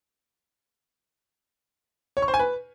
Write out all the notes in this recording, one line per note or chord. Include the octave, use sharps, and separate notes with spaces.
C#5
C#6
C5
G#5
B4